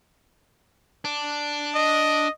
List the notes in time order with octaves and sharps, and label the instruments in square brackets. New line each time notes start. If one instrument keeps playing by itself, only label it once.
[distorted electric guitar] D4
[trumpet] D#5